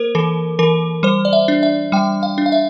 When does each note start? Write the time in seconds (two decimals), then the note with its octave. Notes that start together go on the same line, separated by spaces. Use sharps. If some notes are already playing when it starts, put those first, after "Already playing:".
Already playing: A#3 A#4 C5
0.15 E3 A4
0.59 E3 A#4
1.03 G3 C5
1.25 D5
1.33 E5
1.48 D4
1.63 E5
1.92 G3 G5
2.23 F5
2.38 D4
2.46 F5
2.52 E5